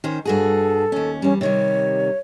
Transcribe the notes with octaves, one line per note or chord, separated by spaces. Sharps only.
D#3 C#4 C5
G2 F#4 G#4 A4
D#2 C#4
E2 G3 C#4
C3 D#3 G3 C#5